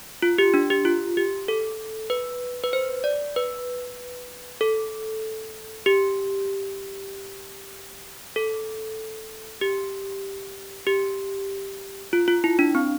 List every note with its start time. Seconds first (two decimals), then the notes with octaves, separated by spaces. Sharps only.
0.22 F4
0.38 G4
0.54 D4
0.70 G4
0.85 F4
1.17 G4
1.48 A4
2.10 B4
2.64 B4
2.73 C5
3.04 D5
3.36 B4
4.61 A4
5.86 G4
8.36 A4
9.61 G4
10.87 G4
12.13 F4
12.28 F4
12.44 E4
12.59 D4
12.75 C4